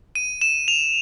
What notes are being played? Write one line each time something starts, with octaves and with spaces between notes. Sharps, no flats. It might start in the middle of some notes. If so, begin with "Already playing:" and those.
D#7
E7
F7